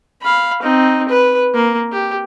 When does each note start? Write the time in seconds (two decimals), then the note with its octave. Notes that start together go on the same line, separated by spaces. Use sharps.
0.22 F5 B5
0.62 C4 D#4
1.09 B4
1.54 A#3
1.92 G4